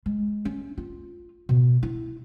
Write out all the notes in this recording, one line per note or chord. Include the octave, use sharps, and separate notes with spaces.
G#3
C#4
F4
B2
E4